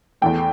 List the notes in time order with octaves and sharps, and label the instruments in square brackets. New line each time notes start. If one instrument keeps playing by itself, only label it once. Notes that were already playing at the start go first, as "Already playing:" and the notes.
[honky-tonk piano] E2 E3 A3 G5